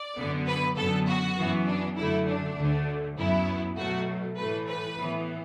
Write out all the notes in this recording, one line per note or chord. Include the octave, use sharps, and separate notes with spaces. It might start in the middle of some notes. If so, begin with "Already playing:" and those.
Already playing: D5
F#2 D3 B3
B4
F#2 D3 B3 A4
F#4
F#2 E3 B3
D4
F#2 D3 A3 E4
D4
D2 D3 A3
F#2 F#3 B3 E4
B2 F#3 A3 F#4
A2 E3 A3 B4
B4
A2 E3 B3